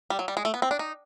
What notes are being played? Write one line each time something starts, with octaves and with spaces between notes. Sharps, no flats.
G3
F#3
G3
G#3
A3
B3
C4
D4
D#4